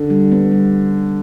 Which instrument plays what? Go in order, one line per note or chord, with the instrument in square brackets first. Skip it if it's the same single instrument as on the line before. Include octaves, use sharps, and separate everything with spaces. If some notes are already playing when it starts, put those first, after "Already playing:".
Already playing: [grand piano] D3
[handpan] G3
B3
G3